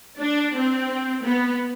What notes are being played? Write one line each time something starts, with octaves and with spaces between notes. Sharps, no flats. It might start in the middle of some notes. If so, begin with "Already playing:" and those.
D4
C4
B3